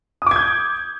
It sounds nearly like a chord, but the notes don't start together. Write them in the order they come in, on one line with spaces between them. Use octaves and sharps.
D#6 D6 G#6 G6